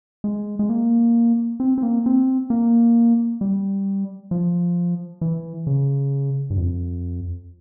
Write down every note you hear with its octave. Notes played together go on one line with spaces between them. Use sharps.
G#3
G#3
A#3
C4
C4
A#3
C4
A#3
G3
F3
E3
C#3
G2
F2